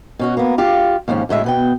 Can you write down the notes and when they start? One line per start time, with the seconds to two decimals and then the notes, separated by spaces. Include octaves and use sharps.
0.19 B2 C#4 F#4
0.37 A#3 B3
0.58 F4 G4 F5
1.08 D#2 G#2 F3 C#4
1.29 D2 A2 G#3 E5
1.44 B2 B3 G5